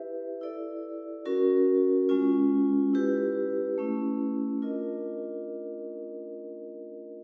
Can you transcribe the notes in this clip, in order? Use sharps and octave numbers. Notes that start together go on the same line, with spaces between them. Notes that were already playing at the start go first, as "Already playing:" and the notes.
Already playing: E4 G4 B4 E5
E4 A4 D5
C#4 F#4 A#4
G#3 C#4 F4
E4 G4 B4
A3 C#4 E4
D4 F4 A#4 D#5